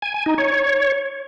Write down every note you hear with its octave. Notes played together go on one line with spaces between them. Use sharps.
G#5
G#5
D#4
C#5